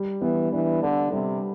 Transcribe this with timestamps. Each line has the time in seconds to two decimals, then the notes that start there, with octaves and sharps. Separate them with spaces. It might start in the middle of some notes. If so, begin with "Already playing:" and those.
Already playing: G3
0.21 E3 B3
0.52 E3 D4
0.83 D3 A4
1.12 C3 G3